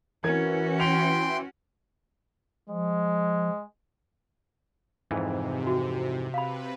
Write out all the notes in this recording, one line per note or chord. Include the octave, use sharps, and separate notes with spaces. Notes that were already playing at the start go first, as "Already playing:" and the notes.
E3 C#4 F#4 A#4 G#6
G5 C6 F7
F3 G#3
F2 G#2 C3 E3
F#4
C3 B4 F5 B5